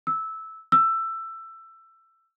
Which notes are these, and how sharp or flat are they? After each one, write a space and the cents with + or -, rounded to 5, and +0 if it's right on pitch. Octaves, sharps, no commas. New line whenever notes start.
E6 -10
E6 +15